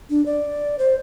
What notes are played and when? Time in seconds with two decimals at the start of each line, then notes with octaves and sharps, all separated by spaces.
0.10 D4
0.26 D5
0.79 C5